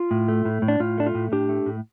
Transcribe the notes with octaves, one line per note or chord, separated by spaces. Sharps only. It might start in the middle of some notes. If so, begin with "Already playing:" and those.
Already playing: F4
A2
A3
A2
A2
D4
A2 F4
A3 D4
F4
A2
A2 D4 G4
A3
A2